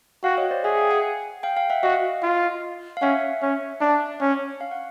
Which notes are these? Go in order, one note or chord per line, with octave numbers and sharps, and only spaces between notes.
F#4 F5 G5
C#5 D#5
C5 D5
G#4 E5 F#5
F5 G5
F#5 G#5
F5 G5
F5 G5
E5 F#5
F#4 D#5 F5
F4
F5
C#4 E5 F#5
C#4
D4
C#4
F5
F#5